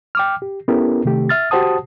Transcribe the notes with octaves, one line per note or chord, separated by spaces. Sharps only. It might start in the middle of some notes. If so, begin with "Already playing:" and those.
G5 D6 F6
G4
B3 C#4 E4 G4 A4 A#4
C3 D#3 A3 G4
E5 F6 A6
F#4 G4 C5 F#5 A5 D#6